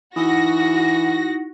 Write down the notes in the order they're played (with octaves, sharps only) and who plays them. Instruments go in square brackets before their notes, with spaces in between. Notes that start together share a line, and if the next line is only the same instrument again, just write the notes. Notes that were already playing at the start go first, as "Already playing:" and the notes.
[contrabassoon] E3 [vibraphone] D#4 E4 F#5 [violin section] F#4 A#6